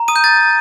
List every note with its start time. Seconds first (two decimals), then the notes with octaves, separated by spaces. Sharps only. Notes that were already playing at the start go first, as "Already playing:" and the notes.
Already playing: A#5
0.08 D#6 D#7
0.16 G6
0.24 A6